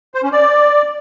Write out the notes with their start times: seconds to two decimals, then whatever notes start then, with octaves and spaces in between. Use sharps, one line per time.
0.14 C5
0.23 C#4
0.32 D5